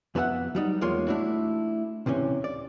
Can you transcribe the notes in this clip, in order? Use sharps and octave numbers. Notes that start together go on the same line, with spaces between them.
F2 B3 D4 A4 E5 F#5
F#3 G3 D#4
E2 G#3 A#3 F4 C#5 C6
A3 D4 E4 F#4
D2 C3 E3 C#4
D5